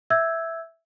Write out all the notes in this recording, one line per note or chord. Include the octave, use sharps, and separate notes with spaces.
E5 E6 G6 G#6